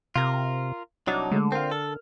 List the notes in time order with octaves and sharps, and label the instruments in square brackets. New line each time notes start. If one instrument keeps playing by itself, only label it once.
[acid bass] C3 [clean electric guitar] F4 A#4
[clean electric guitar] C2 F#3 D#4 [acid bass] D4
[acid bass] D3 [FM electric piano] G#3 A3
[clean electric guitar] C4 F4 [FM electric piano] A#4 F6
[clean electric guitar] A4